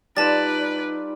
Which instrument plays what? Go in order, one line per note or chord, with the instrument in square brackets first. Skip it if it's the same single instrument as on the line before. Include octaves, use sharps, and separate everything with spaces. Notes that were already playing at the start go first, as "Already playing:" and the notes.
[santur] G3 F4 [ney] D#4 [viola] B4 D5 [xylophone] A5 A6